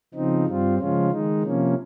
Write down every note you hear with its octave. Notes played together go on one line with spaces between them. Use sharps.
C#3 F3 C4 D#4
G2 G3 C4 F4
C#3 F3 G#3 C#4 F4
D#3 G#3 D#4
C3 F3 A#3 C#4